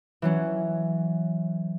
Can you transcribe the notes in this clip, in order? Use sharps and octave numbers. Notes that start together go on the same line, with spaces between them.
E3 F#3 C#4